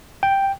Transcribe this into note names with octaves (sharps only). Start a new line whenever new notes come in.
G5